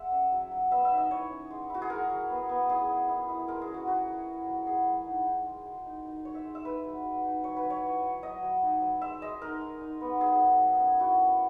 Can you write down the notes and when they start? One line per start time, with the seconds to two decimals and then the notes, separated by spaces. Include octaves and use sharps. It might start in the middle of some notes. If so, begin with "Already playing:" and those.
Already playing: G#3 E5 F#5
0.12 C#4
0.32 F#3
0.51 F#3
0.71 B3 E5
0.85 E5
0.91 D#4
0.97 D#5
1.11 E4 C#5
1.31 C#4
1.50 G#3
1.70 E4 F#4
1.82 G#4
1.90 F#3 A#4
2.10 F#3
2.30 B3
2.49 B3
2.69 E4 G#4
2.89 E4
3.08 E4
3.29 E4
3.48 G#3 A#4
3.61 G#4
3.68 C#4
3.74 F#4
3.87 E4 F#4
4.07 E4
4.27 E4
4.47 F#3
4.66 F#3 G#4
4.86 F#3
5.06 D#4
5.26 D#4
5.46 G#3
5.65 G#3
5.86 D#4
6.05 D#4
6.25 D#4 C#5
6.35 E5
6.45 G#3
6.55 E5
6.65 D#4 B4
6.84 F#3
7.04 F#3
7.24 D#4
7.43 F#3 C#5
7.57 B4
7.63 F#3
7.70 C#5
7.84 E4
8.03 F#3
8.23 F#3 D#5
8.43 F#3
8.63 D#4
8.82 F#3
9.02 G#3 E5
9.22 G#3 D#5
9.42 D#4 A#4
9.61 G#3
9.81 D#4
10.01 B3
10.21 F#3 G#4
10.40 D#4
10.60 F#3
10.80 C#4
11.00 E4 F#4
11.19 C#4